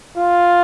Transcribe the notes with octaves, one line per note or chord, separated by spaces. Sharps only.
F4